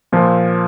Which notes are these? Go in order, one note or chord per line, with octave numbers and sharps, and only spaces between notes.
A#2 F3 A#3